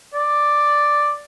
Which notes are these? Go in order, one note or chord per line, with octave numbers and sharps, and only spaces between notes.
D5